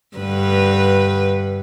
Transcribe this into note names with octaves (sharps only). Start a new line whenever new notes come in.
G2 D3 B4